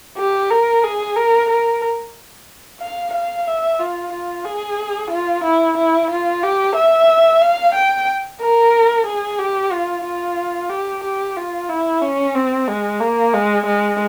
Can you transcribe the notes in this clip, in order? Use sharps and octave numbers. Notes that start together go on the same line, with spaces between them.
G4
A#4
G#4
A#4
A#4
F5
F5
E5
F4
F4
G#4
F4
E4
E4
F4
G4
E5
F5
G5
A#4
G#4
G4
F4
F4
G4
G4
F4
E4
C#4
C4
G#3
A#3
G#3
G#3